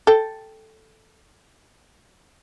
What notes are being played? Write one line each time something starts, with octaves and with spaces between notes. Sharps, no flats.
A4 G5